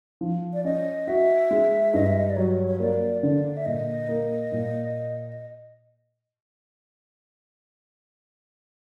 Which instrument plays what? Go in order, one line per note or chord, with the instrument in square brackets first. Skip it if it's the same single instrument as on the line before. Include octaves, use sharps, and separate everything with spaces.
[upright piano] F3
[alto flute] D5
[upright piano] C#4 [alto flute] D#5
[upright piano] F#4 [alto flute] E5
[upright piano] G#3
[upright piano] G2 [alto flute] D#5
[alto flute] E5
D#5
D5
[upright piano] F#3 [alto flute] C#5
[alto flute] C#5
[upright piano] A#3 [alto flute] D5
[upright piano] D3 [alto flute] D5
[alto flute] E5
[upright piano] A#2 [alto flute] D#5
[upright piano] A#3
A#2